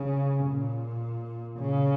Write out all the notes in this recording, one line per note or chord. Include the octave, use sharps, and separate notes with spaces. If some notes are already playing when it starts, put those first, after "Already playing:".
Already playing: C#3
A#2
C#3